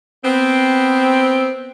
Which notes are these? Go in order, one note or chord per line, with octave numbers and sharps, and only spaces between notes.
B3 C4